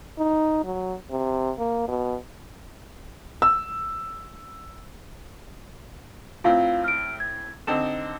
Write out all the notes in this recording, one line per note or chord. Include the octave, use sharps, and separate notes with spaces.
D#4
F#3
C3
A#3
B2
E6
A2 C4 F4 F5
F6 D7
G#6
D3 C4 D#4 E7